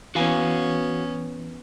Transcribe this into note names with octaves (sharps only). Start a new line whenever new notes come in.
E3 B3 C#4 F#4 F5 G#5